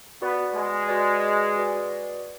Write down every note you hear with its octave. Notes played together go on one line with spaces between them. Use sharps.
B3 F#4 B4 D5
G#3
F#4 B4 D5
F#4 B4 D5